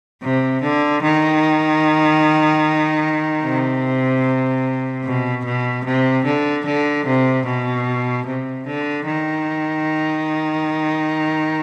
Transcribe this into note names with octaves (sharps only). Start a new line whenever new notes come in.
C3
D3
D#3
C3
B2
B2
C3
D3
D3
C3
B2
C3
D3
D#3